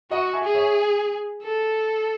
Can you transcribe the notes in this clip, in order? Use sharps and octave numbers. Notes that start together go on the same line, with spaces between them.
F#4 D#5 F#5
E5 G#5
G#4
C#5 E5
A4